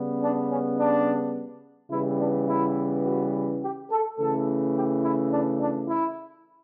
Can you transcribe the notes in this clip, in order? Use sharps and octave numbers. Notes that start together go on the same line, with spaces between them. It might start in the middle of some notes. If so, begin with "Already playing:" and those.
Already playing: C#3 G3 B3
D4
C#4
D4
C#3 E3 G3 B3 E4
D4
E4
F#4
G4
A4
C#3 E3 A3 A4
G4
E4
D4
D4
E4